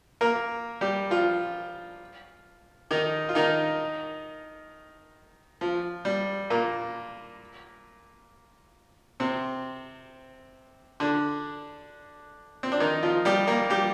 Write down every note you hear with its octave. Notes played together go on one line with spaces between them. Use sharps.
A#3 A#4
G3 G4
F3 F4
D#3 D#4
F4
D#3 D#4
F3
G3
A#2 A#3
C3 C4
D3 D4
C4
D4
D#3 D#4
F3 F4
G3 G4
A#3 A#4
G3 G4